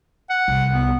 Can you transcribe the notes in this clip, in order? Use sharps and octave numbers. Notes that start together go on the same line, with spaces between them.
F#5
C2
B3